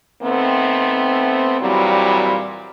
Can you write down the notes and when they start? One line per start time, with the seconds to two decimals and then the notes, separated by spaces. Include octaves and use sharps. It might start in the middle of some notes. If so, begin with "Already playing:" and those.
0.23 D#3 A3 B3 C4
1.61 A#2 E3 F#3 G3 C4 E4